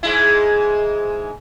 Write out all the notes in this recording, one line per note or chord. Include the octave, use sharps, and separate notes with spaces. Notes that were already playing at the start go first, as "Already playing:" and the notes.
G#2 G#3 E4